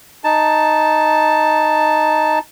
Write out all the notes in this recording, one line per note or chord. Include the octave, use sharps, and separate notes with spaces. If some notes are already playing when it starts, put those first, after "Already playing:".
D#4 A5